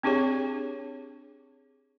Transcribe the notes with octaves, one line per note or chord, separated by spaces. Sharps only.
C4 D4 G4 G#4 C#5